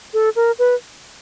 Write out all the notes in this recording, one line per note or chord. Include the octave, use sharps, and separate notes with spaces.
A4
A#4
B4